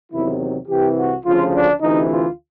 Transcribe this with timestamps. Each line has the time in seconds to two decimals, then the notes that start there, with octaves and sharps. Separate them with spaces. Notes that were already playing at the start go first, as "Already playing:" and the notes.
0.12 E2 C3 D#3 F#3 E4
0.68 C2 C3 E3 G4
0.97 F#4
1.25 D2 C#3 F3 F4
1.52 D4
1.81 D2 C3 E3 D#4
2.09 F4